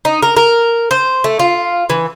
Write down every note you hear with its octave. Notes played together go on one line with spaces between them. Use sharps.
D#4
A#4
A#4
C5
A3
F4
E3